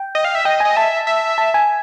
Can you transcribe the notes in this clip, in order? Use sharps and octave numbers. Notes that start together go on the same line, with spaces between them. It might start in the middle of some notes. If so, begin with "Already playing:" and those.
Already playing: G5
D#5
F5
E5
D#5 G5
D#5 G#5
E5 A5
E5
A5
G#5